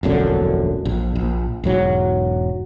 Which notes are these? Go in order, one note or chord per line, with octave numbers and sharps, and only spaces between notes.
E1 A#1 F#2 D3
A#1
A#1
E1 G#2 F#3